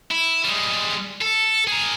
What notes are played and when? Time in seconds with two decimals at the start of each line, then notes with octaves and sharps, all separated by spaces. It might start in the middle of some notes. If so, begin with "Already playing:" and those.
0.11 E4
0.44 G3 G#3
1.21 A4
1.67 G#4 A#4